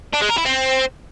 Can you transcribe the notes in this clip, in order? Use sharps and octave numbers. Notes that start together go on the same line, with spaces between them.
D4
G#3
A#4
E4
C4